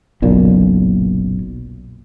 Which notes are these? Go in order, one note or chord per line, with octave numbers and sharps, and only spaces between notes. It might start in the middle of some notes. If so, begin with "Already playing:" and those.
F#1 B1 A#2